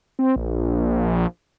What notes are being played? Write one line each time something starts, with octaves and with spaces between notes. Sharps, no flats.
C4
A#1